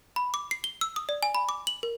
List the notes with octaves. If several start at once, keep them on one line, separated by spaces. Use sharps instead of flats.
B5
D6
C7
G7
E6
D#6
D5
G#5
B5
D6
F#7
A#4